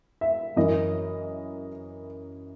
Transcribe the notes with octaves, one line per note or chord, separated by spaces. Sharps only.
E5
F#2 E3 A#3 D#5